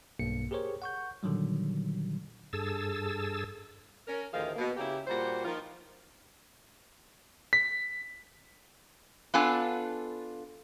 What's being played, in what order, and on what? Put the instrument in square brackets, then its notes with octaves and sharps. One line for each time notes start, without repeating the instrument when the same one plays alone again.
[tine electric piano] B1 G2 B2 A#3 C#7
G4 G#4 A#4 C5 C#5
F#5 C#6 G6
A#2 D3 D#3 F#3 G3
[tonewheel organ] G2 G#4 A4 A5 E6
[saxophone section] C#4 A#4
D2 A2 D#3 F3 G#4 F5
B2 A#3
C#3 A#3 E4 G4
A#2 G3 F#4 C5
D#3 F3 F4
[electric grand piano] B6
[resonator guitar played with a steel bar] B3 D4 F4 A4 G#5